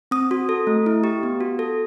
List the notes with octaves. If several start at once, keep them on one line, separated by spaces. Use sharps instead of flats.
C4 D#6
F#4
A4
A3
E4
G4
B3
F#4
A4